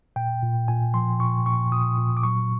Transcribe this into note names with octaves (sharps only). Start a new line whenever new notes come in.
A#2 G5
A#2
A#2 G#5
F3 C6
A#2 C#6
A#2 C#6
A#2 D#6
A#2
D6
F#3 C#6